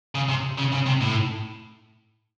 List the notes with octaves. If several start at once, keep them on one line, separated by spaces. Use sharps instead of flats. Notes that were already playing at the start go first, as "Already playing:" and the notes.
C#3
C3
C#3
C#3
C3
A2